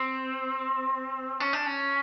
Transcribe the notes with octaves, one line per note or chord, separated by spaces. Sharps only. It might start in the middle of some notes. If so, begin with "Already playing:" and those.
Already playing: C4
C#4
D4
C#4